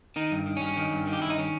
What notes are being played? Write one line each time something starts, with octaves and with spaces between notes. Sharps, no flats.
D#3 D#4
G2
D#3
G2 C#4
D#3
G2
D#3
G4
G2 E4
D#4
D#3 C#4